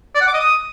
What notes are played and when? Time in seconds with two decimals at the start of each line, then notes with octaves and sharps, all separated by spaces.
0.15 D5
0.21 F#5
0.27 D6
0.34 D#5
0.40 D#6